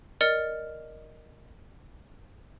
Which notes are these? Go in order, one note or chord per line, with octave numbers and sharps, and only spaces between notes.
A#4 D5 D#5 F6 A6 C#7